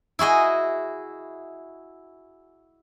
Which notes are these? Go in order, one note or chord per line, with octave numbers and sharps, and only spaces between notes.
E4 F#4 G#4 D#5